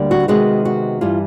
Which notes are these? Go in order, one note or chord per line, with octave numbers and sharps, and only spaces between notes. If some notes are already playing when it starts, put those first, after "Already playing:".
Already playing: D2 D3 G3 A#3
F#4
C3 D#3 G#3 B3 F#4
F#4
G2 E3 G3 F4